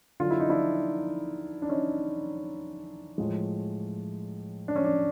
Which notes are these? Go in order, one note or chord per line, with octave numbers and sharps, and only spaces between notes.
D3 F#3 F4
E4
D#4
D4 E4
D4
C#4 D#4
A2 F3 G#3
D4
C#4
D4